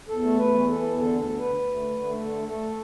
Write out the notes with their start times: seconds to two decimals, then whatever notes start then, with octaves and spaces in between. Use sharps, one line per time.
0.08 E2 A4
0.23 A3
0.38 E2 B4
0.53 E3
0.68 E3 A4
0.82 E2
0.97 D3 A4
1.13 D2
1.18 A4
1.28 D3
1.38 B4
1.43 D2
1.58 D2
1.73 A3
1.89 D3
2.02 A3
2.18 D3 A4
2.33 A3
2.48 A3 A4